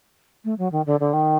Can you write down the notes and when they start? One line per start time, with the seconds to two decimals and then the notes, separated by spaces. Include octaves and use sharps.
0.44 A3
0.58 F#3
0.72 D#3
0.86 D3
1.00 D3
1.13 D#3